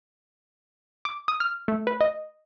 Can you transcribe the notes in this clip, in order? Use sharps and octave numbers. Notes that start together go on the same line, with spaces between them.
D6
D#6
F6
A3
B4
D#5